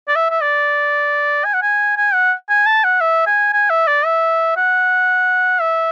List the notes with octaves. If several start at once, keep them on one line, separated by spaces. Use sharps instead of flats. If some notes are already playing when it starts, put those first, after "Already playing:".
D5
E5
E5
D5
G#5
F#5
G#5
G#5
F#5
G#5
A5
F#5
E5
G#5
G#5
E5
D5
E5
F#5
E5